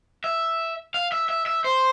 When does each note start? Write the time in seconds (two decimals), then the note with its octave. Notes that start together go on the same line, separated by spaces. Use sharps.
0.24 E5
0.94 F5
1.12 E5
1.29 E5
1.46 E5
1.64 C5